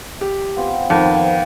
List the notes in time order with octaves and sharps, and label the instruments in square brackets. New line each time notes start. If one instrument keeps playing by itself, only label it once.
[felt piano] G4
[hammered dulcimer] B3 C4 F4
[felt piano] F2 D#3 [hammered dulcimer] F5